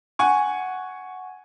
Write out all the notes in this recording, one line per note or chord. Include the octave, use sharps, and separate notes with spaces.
F#5 G#5 C#6